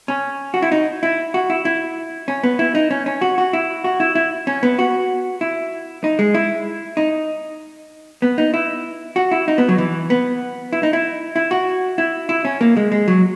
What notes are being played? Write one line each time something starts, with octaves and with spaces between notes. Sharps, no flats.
C#4
F#4
E4
D#4
E4
F#4
E4
E4
C#4
B3
E4
D#4
C#4
C#4
F#4
F#4
E4
F#4
E4
E4
C#4
B3
F#4
E4
D#4
G#3
E4
D#4
B3
D#4
E4
F#4
E4
D#4
B3
F#3
E3
B3
E4
D#4
E4
E4
F#4
E4
E4
C#4
A#3
G#3
G#3
F#3